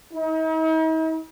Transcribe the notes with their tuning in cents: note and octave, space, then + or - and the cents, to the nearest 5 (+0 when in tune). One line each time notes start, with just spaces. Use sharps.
D#4 +45